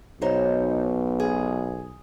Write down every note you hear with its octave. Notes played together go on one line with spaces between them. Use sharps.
B1 B2 D#4 C5 C#5
G#4